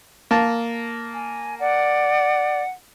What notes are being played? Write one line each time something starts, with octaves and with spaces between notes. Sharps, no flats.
A#3 A5
G#5
D5 F#5